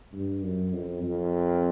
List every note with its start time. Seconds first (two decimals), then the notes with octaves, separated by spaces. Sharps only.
0.13 G2
0.42 F#2
0.73 F2
1.03 F2